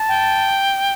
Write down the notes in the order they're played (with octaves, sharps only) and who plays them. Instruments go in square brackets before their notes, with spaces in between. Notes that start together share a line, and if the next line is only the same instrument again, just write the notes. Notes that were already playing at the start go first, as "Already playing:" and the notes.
Already playing: [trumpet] A5
[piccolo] G5